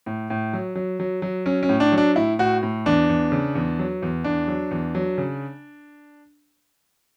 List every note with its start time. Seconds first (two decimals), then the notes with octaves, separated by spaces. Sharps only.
0.06 A2
0.30 A2
0.53 F#3
0.75 F#3
1.00 F#3
1.22 F#3
1.46 F#3 C#4
1.63 C#4
1.69 A2
1.80 D4
1.92 F#3
1.98 D4
2.16 A2 E4
2.39 A2 F#4
2.63 A2
2.86 E2 D4
3.09 E2
3.32 C#3
3.55 E2
3.79 F#3
4.02 E2
4.24 E2 D4
4.48 F#3
4.71 E2
4.95 F#3
5.18 C#3